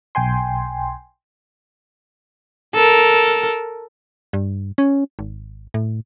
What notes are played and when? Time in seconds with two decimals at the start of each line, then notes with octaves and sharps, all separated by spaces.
0.15 B1 G5 G#5 C6
2.75 A4 A#4
4.33 G2
4.78 C#4
5.19 G#1
5.74 A2